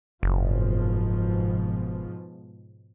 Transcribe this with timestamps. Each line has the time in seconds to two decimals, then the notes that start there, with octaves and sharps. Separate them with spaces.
0.23 F#1 G#2 B2 F3